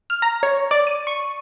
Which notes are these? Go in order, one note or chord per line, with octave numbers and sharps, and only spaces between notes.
F6
A#5
C#5
D5
D#7
C#6